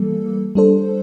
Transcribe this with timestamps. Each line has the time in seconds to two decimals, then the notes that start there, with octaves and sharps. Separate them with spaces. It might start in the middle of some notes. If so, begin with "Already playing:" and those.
Already playing: E3 G3 A#3 A4
0.55 G3 D4 A4 C5